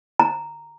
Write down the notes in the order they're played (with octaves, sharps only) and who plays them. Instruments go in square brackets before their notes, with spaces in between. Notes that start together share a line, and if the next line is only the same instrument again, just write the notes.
[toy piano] A#5